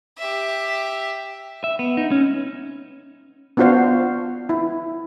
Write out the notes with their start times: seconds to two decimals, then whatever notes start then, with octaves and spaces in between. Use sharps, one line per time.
0.18 G4 E5
1.64 E5
1.79 B3
1.97 D#4
2.11 C#4
3.57 B3 D4 F4 F#4 C5 F5
4.49 E4